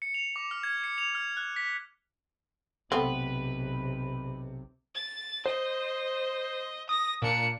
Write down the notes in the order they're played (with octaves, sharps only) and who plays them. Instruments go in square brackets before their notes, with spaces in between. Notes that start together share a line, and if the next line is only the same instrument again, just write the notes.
[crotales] C#7
F7
D6
F6
G#6
C#7
F7
F6
F#6
B6
[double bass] B1 C3 [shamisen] A3 B3 C4 [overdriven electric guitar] B4
[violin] A6
[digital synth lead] C5 [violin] D#5
[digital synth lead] D#6 [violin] A#6
[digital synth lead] A#2 [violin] D4 C#7